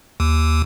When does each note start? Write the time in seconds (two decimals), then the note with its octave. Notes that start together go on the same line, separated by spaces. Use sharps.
0.20 D#2